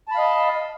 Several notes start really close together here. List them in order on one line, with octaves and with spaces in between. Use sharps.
A5 B5 F5 D#5